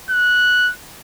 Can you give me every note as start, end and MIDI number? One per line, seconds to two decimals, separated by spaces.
0.10 0.71 90